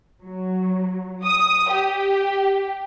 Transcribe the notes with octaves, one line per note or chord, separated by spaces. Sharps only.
F#3
D#6
G4